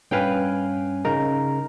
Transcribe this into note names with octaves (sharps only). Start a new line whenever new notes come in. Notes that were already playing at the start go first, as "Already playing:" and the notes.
G2 C#4 B4 F5 G5 G#5
C#3 D#4 A#4